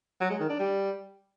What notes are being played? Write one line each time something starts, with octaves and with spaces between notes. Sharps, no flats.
F#3
G#3
D#3
D4
G3